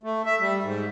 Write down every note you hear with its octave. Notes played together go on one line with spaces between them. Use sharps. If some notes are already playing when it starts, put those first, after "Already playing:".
A3
E5
G3
G#2